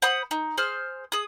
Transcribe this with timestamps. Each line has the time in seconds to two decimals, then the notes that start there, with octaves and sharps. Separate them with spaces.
0.02 C5 F#5 B5 D#6
0.31 D#4
0.58 G#4 C5 F6
1.12 G#4 D#6